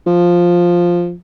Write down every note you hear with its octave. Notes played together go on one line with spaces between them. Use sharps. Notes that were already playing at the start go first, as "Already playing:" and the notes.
F3